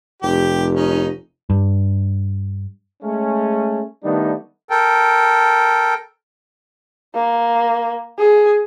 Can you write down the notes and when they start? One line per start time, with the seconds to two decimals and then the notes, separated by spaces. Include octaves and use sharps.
0.22 F1 G4
0.75 C#4 D#4
1.50 G2
3.03 G#3 A3 C#4
4.04 D#3 G3 A3 B3 D4 D#4
4.70 A4 A#4 G5
7.15 A#3
8.19 G#4